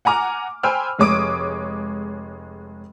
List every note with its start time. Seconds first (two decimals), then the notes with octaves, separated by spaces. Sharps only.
0.05 F#5 G#5 A#5 D6 F6
0.63 C5 G5 G#5 B5 E6 F6
0.99 F1 G#3 C#5 D6 D#6 D7